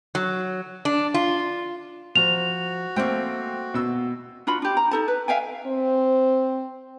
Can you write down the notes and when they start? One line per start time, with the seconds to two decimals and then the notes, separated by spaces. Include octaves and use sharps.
0.15 F#3
0.85 D4
1.14 F4
2.15 F3 F#4 A#5 F7
2.96 A3 A#3 C4 G5
3.74 B2 E6
4.47 D4 F4 F#4 B5
4.62 D4 G4
4.77 A#5
4.91 D#4 A4 A5
5.08 B4
5.28 E5 F5 G5 G#5
5.67 C4